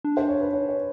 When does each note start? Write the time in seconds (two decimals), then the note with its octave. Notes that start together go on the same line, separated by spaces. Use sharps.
0.04 D4
0.17 C5
0.29 C#5
0.41 B4
0.53 C#5
0.69 C#5